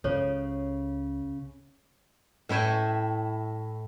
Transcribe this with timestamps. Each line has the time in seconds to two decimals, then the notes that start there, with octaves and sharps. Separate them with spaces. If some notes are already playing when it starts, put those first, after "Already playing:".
0.04 C#2 C#3 F4 A4 C5 C#5
2.49 A2 E4 C#5 G5 G#5